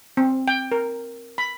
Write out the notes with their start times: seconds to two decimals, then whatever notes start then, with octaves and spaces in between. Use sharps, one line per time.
0.17 C4
0.48 G5
0.72 A#4
1.38 B5